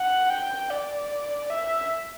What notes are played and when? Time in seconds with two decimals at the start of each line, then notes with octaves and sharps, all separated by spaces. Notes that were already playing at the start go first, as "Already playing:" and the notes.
Already playing: F#5
0.30 G5
0.70 D5
1.50 E5